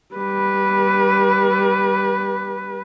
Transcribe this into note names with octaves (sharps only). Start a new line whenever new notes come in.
G3 B4